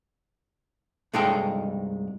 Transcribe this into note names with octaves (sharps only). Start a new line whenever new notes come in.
C2 G2 G#3 D#4 A4 G5